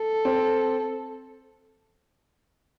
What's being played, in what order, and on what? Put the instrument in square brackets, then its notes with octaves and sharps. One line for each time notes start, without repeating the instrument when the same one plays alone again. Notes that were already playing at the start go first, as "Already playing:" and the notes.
Already playing: [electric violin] A4
[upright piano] C4